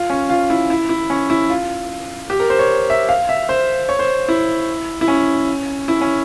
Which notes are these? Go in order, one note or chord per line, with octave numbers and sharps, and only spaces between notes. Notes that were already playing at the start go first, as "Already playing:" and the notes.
Already playing: F4
C#4
F4
E4
E4
E4
C#4
E4
F4
G4
A#4
C5
C#5
E5
F5
E5
C5
C#5
C5
E4
E4
C#4
E4
C#4